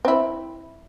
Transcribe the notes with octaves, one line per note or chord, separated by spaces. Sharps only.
C4 E4